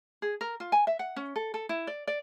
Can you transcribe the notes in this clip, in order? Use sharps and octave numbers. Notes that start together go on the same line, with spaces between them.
G#4
A#4
F4
G#5
E5
F#5
C#4
A4
A4
E4
D5
D5